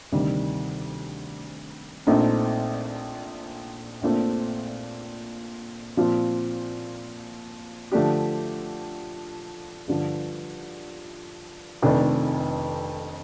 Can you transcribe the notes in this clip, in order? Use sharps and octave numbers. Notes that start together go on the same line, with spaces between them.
D2 C3 D#3 G3
A#1 A#2 A3 C4 D#4
A#1 A#2 A3 C4
A#2 F3 C4 F4
D3 F3 A3 D4 G4
G2 D3 F3
F1 F2 D#3 A3 D4